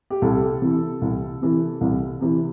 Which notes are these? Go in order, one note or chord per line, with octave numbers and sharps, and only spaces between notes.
G4
C2 A4
C3 E3
C2
C3 E3
C2
C3 E3